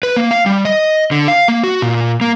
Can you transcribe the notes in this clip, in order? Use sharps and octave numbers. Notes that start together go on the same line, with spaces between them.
B4
A#3
F5
G3
D#5
D3
F5
A#3
F#4
A#2
A#3